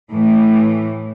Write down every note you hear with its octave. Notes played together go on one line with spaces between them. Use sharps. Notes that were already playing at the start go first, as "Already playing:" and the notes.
A2 E3 A3